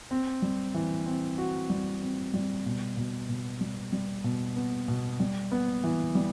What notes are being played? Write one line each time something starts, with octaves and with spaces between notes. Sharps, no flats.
C4
G3
E3
C4
F#4
G3
C4
G3
B2
B2
B2
G3
G3
B2
B3
B2
G3
B3
E3
G3